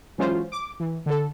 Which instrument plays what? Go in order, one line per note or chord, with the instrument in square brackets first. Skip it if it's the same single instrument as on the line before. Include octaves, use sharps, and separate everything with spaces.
[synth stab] E3 F#3 G#3 C#4 F4 C5
D6
E3
D3 A4